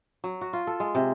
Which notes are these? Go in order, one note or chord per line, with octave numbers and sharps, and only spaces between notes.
F#3
F#4
F4
A4
G#3
C3